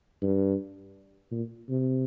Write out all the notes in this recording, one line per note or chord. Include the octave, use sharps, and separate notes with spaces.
G2
A#2
C3